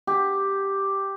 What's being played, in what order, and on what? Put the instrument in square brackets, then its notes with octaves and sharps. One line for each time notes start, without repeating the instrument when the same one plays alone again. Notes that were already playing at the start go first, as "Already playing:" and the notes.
[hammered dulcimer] G4